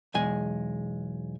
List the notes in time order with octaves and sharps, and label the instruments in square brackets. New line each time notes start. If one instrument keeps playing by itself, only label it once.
[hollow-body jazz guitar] B1 E2 G#3 G#5